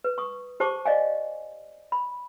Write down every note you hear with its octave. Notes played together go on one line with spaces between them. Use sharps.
B4
C#6 D#6
G4 C5 A5 C#6 D6
D5 D#5 F5 G#5
B5